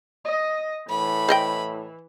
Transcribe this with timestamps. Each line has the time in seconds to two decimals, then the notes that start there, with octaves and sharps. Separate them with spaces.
0.25 D#5
0.89 A2 E3 B5
1.29 C5 D#5 G5